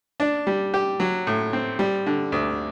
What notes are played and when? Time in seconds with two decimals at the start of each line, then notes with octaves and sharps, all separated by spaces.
0.20 D4
0.47 G3
0.74 G4
1.00 F#3
1.27 A2
1.53 C4
1.79 G3
2.06 D3
2.32 D2